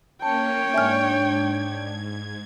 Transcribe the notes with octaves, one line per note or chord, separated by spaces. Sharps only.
A#3 C#4 C#5 G5 A5 C#7
G#2 D4 E5 G#5 F6 G#6